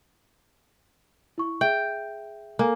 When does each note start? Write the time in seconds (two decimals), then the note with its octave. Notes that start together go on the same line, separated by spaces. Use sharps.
1.38 E4 C#6
1.61 G#4 E5 G5
2.59 A#3 A4 G#5